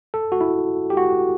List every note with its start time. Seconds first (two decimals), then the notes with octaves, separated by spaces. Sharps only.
0.14 A4
0.32 F#4
0.41 E4
0.90 G4
0.97 F#4